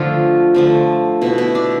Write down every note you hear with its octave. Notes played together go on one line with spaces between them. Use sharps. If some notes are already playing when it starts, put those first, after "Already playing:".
Already playing: D3 F3 A3 F4
D3 F3 A3
B2 B3 E4
E4
D4